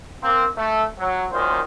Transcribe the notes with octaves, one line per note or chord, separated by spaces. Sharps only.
A#3 C4
A3
F#3
F#2 A#2 D#3 C5